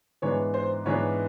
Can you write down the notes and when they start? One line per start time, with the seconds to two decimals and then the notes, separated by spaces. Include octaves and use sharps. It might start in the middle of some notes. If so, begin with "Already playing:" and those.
0.22 G#2 E3 G#3 B3 D4 C#5
0.54 C5
0.86 G#2 E3 G#3 B3 D4 C#5